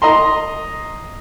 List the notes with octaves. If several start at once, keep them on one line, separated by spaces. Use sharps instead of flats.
D#5 A#5 C6